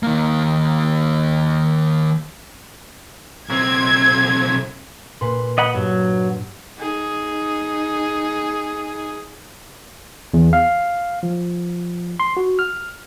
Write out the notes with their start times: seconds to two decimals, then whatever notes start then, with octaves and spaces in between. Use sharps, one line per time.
0.03 D#3 A#3
3.49 B1 C4 G#6
5.21 A#2 B4 C6
5.58 D#5 F#5 B5
5.75 G2 F#3
6.78 D#4 G#4
10.34 E2
10.53 F5
11.23 F3
12.20 C6
12.37 F#4
12.59 F6